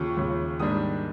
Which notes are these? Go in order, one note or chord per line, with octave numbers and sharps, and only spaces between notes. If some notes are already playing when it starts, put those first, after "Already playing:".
Already playing: D#2 C#3 F3 C#6
D#2 C#3 F3
G#2 D#3 G3 A#3 D4 D#6